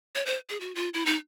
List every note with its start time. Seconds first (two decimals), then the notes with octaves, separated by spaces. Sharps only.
0.15 C#5
0.26 C5
0.49 G#4
0.60 F#4
0.75 F4
0.94 E4
1.06 D#4